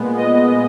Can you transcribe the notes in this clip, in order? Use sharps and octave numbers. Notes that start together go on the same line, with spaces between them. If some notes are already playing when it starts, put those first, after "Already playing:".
Already playing: A#2 G#3 B3
D#5